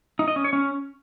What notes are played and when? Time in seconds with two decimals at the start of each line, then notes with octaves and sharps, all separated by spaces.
0.19 D#4
0.28 D#5
0.36 C#4
0.44 C#5
0.53 C#4